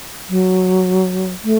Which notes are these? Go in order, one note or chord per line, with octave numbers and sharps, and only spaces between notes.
F#3
A3